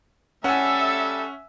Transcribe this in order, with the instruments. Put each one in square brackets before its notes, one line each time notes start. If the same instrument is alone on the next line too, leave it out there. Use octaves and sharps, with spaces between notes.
[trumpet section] G3 A4 [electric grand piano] C#4 [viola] E5 [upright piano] F#5 G#5